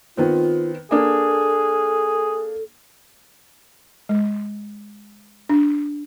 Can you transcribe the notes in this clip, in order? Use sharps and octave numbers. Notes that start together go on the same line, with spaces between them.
D#3 B3 C4 F4
A#3 D4 G#4 A4
G#3
D4